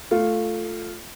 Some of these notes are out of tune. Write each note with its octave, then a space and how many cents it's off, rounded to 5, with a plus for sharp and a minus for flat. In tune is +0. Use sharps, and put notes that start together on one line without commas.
A3 +0 F4 +0